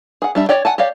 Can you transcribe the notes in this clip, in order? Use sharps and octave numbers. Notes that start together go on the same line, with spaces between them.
G#4 F#5
G3 D4 E5
C#5 D5 G5
F#5 G#5 A5
G4 C#5 D5 F5